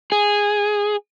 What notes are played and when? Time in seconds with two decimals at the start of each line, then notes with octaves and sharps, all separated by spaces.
0.12 G#4